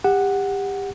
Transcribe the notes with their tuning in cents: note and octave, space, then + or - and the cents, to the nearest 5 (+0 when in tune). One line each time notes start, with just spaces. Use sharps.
G4 +25 F#5 +0